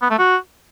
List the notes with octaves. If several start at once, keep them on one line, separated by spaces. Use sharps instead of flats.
B3
A3
F#4